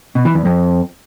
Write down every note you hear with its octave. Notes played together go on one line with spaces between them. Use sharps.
B2
E3
E2
F2